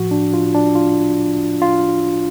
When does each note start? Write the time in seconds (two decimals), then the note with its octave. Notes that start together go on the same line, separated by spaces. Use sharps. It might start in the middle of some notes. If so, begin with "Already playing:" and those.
Already playing: A2 F3 F#4
0.11 D4
0.34 F4
0.55 D4
0.75 F4
1.62 F4